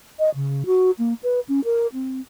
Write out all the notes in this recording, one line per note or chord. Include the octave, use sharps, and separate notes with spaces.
D#5
C#3
F#4
A#3
B4
C#4
A#4
C4